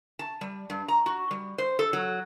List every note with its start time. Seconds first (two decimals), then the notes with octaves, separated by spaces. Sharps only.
0.19 A5
0.41 G3
0.70 G2
0.88 A#5
1.06 F#4
1.31 G3
1.58 C5
1.79 A4
1.93 F#3